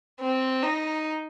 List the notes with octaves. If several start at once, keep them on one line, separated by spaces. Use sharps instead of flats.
C4
D#4